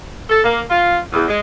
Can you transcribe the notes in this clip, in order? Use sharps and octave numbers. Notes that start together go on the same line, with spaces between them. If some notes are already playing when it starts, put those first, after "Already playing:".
A4
A#3
F4
E2
G#3